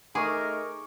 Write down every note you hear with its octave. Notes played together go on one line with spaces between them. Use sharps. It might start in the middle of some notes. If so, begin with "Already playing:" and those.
A3 D#4 G#4 A#4 C#6 D6